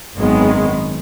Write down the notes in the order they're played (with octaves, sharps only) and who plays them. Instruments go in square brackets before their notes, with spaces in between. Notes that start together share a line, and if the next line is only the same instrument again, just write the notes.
[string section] G#1 F#2 D#3 G#3 B3